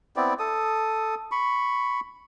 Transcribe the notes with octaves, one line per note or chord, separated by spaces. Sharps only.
B3 C4 E4 D5
A4 D#6
B5 C#6